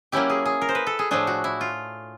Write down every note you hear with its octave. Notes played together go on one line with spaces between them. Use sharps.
F#3 A#3 C#4 E4 G4
G#4
G#4
A#4
C5
B4
A4
G#4
A2 F3 A3 D4 G#4
F#4
E4
F4